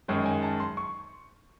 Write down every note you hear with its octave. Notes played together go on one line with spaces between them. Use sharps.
F#2 D#3 G#3 C#5
G#5
A5
C6
C#6